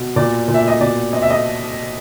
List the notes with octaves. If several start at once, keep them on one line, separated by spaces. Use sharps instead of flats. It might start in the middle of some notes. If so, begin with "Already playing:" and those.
Already playing: B2
A#2 D5
A#2
E5
D#5
B2 D5
C4 D#5
E5
D#5